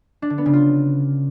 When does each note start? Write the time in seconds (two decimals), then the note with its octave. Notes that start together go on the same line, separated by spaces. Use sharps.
0.22 D4
0.30 D3
0.38 B3
0.46 C#3
0.53 F4